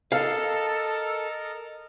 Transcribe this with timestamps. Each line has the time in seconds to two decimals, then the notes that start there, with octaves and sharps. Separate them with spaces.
0.12 A4 A#4 D#5 F5 A5